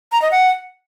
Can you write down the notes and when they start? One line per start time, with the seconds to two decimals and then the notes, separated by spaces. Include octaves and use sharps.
0.12 A#5
0.22 D#5
0.31 F#5